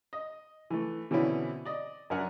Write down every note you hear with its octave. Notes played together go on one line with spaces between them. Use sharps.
D#5
E3 A3
B2 D3 E3 C4 C#4 E4
D5 D#5
F#2 D4 A#4 E5 F#5 G#5